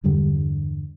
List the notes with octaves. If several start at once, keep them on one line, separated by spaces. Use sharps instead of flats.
E2 G2 D3 G3